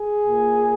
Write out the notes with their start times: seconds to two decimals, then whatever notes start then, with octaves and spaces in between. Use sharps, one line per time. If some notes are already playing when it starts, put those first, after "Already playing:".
Already playing: G#4
0.27 A#2 A#3